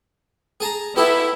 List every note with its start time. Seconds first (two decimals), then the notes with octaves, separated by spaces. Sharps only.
0.60 G#4 A5 A#5
0.96 B3 E4 G4 A4 E5